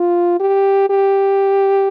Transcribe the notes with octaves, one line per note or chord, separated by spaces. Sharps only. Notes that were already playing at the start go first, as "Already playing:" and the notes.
Already playing: F4
G4
G4